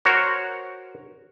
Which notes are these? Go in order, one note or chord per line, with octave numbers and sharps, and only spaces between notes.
F#4 A#4 C5 C#5